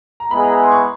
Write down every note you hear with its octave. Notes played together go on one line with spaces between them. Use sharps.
A#5
G#3 B3 E4 G#4 B5
A#5
C6
C#6